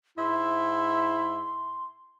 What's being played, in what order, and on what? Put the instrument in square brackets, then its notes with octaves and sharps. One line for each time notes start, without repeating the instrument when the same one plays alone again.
[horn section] G#2 E5 [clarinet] E4 [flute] C6